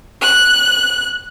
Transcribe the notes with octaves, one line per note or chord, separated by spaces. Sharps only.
F#6